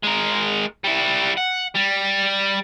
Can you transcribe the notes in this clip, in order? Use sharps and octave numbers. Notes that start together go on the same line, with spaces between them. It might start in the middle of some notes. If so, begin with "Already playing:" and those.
G#3 A#4
G3 E4
F#5
G3